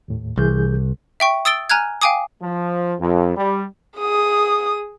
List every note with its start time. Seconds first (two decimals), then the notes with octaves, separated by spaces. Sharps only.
0.08 D#2 A2
0.38 C2 E3 G#4 G6
1.20 E5 G5 C#6
1.45 D#6 E6 A6 D7 G7
1.70 G#5 A#5 F6 F#6 G#6
2.02 F5 G5 G#5 D6 D#6
2.42 F3
3.00 F2
3.36 G3
3.98 G#4 D#6